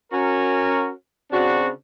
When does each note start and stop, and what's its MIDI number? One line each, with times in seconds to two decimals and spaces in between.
0.12 0.91 61
0.12 0.91 66
0.12 0.91 70
1.32 1.69 49
1.32 1.69 60
1.32 1.69 62
1.32 1.69 66